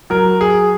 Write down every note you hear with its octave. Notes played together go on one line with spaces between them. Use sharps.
F#3 A#4
G#4